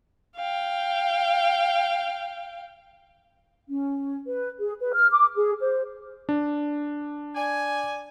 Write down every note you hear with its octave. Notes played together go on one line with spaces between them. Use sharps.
F5 G5
C#4
B4
G#4
B4
F6
D6
G#4
C5
D4
D5 G#5